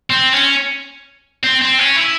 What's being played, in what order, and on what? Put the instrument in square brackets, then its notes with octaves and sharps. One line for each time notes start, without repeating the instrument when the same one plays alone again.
[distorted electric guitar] C4
C#4
C4
C4
C#4
E4